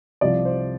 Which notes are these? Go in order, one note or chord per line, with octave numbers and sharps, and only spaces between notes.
C2 C3 F3 D5
C5